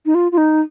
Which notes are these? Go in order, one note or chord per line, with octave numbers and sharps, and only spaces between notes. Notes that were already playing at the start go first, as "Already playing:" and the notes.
D#4
F4
F4
D#4